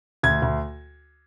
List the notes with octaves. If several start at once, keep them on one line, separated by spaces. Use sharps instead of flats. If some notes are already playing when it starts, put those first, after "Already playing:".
D2 G#6
D2